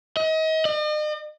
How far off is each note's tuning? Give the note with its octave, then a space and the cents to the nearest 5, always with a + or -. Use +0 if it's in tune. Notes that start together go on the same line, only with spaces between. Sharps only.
D#5 +35
D#5 -45